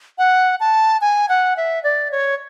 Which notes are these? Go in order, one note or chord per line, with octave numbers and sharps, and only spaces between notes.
F#5
A5
G#5
F#5
E5
D5
C#5